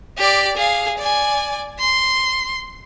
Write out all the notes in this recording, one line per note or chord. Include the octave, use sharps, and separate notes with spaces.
G4 D5
G#4 F5
D5 G#5
C6